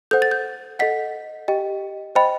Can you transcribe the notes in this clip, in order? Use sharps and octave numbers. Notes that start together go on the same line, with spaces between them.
A4 C5 F#5 G6
A6
G6
A4 D#5 F#5 B6
G4 D#5 G5
C5 D#5 G5 B5